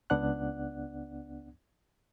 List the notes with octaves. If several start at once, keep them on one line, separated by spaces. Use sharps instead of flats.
C#2 B3 D4 D5 F#5 F#6